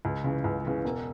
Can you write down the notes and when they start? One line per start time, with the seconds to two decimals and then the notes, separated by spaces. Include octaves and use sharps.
0.05 C#2
0.24 C#3 E3
0.44 C#2
0.65 C#3 E3
0.85 E1